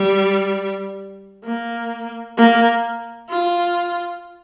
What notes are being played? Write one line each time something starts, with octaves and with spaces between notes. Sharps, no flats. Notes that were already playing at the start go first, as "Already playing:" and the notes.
Already playing: G3
A#3
A#3
F4